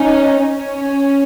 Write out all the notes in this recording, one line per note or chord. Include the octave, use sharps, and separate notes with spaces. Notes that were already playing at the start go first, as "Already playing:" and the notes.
Already playing: C#4 D#4
C#4